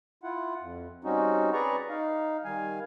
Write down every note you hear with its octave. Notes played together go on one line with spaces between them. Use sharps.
E4 F4 F#5
F2
G3 C4 C#4 D#4 F#4
G#4 B4 D5 A#5 C#6
D#4 F5
D#3 G3 F5 G#5